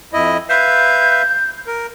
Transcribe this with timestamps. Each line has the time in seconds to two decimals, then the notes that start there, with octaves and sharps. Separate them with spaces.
0.13 F2 E4 D#5
0.50 B4 E5 F5 G6
1.67 A#4